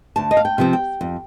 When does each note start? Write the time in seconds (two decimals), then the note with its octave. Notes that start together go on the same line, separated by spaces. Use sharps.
0.16 D2 A5
0.31 D#5
0.37 F5
0.45 G5
0.58 C3 F3 C4
0.73 G5
1.01 F2